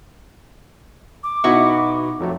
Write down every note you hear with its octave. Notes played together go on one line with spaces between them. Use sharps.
D6
B2 B3 D#4 E4 F#4 C#6
F2 F#3 A3